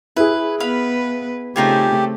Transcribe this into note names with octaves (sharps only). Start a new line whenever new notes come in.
E4 G#4 B4
B3 B4 F5 B5
C#3 A3 C4 D#4 F4 G4 G#5